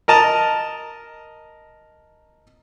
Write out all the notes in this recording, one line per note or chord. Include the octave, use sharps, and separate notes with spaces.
A#4 D#5 A5 A#5